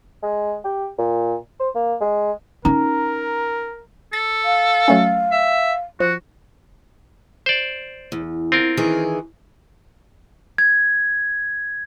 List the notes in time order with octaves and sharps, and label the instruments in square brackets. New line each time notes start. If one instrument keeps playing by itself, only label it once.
[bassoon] G#3
G4
A#2
C5
A#3
G#3
[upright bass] C#4 D#4 [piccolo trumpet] A#4 [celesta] A#5
[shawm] A4 [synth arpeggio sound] A6
[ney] F5
[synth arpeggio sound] F#3 A3 C#4
[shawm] E5
[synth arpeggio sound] F3 [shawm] F#4
[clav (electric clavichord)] C5 D5
[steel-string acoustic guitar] E2
[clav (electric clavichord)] C4 F4 A#4
[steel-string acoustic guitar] D#3 E3 G#4
[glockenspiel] G#6